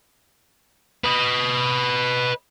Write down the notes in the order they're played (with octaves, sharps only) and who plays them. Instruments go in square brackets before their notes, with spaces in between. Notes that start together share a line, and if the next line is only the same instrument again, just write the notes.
[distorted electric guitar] B4 D#5